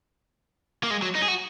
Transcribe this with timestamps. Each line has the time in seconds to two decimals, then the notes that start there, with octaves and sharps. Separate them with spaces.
0.83 A#3
0.90 G#3
1.02 F#3
1.15 D#4
1.22 G#4
1.28 F#4